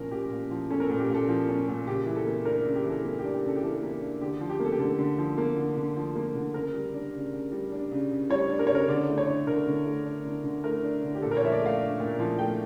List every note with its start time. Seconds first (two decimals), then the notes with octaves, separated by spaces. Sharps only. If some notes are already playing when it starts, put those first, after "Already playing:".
Already playing: A#2 F3 C#4 A#4
0.11 A#2 G4
0.31 A#2
0.51 F3
0.70 C#4 A4
0.80 A#4
0.85 A4
0.90 A#2
0.99 G4
1.09 A#2
1.14 A4
1.29 F3
1.49 C#4
1.68 A#2
1.87 C#3 G4
2.06 E3
2.16 A4
2.26 A#3
2.45 D4 A#4
2.65 C#3
2.75 G4
2.84 E3
2.90 A4
3.04 A#3 A4
3.19 G4
3.24 D4
3.33 G4
3.43 C#3 A4
3.56 G4
3.62 E3 A4
3.82 A#3
4.01 D4
4.21 D3 G4
4.41 F3
4.50 G4
4.60 A#3
4.65 A4
4.72 G4
4.79 D3 A4
4.99 D3
5.18 F3
5.38 A#3
5.57 D3
5.77 D3
5.96 F3
6.15 A#3
6.35 D3
6.54 C#3 A#4
6.74 G3
6.94 D4
7.13 C#3
7.33 C#3
7.52 G3
7.72 D4
7.91 C#3
8.11 C#3
8.30 G3 C#5
8.50 D4
8.59 A#4
8.67 C#3 C#5
8.75 A#4
8.88 D3 D5
9.08 A3
9.18 C#5
9.28 D4
9.47 D3 A#4
9.67 D3
9.85 A3
10.05 D4
10.25 D3
10.44 D3
10.64 A3 A#4
10.83 D4
11.03 D3
11.15 G4
11.22 A#2 A4
11.31 A#4
11.37 C#5
11.42 F3 E5
11.52 D5
11.61 A3 F5
11.81 D4
12.00 A#2
12.19 F3
12.38 A3 G5